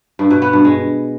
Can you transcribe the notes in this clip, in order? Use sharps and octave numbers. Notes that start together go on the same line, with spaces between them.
G2
B2
B3
G2
G#3